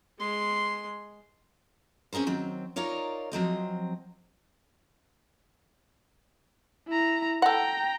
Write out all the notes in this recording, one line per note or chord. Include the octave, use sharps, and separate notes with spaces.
G#3 C6
C4 C#4 G#4 A#4 C5
D#3 F#3 C4
D#4 F4 A#4 C#5 D5
F3 F#3 C4 D#5
E4 A#5
A4 F#5 G5 A#5